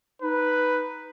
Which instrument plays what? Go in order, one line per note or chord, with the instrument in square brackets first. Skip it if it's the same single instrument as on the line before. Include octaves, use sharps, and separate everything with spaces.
[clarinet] D#4 [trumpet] B4